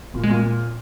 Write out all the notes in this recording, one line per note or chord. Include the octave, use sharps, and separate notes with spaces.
A#2 A#3
G#3
A#2